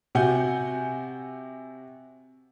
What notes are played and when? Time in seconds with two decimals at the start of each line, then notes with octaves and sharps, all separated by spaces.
0.15 C3 F#4 F#5 G#5 G6